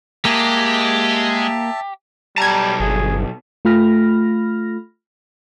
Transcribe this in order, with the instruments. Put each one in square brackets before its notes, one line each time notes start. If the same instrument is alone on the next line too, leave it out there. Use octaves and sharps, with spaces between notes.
[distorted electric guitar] G#3 [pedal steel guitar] A#3 [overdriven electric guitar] G4 [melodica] E5 A5
[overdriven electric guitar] B1 A5 [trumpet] G3 [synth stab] A#5 G#6
[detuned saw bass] G1 [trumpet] G#4
[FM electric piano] A3 F4 B5 F6 A#6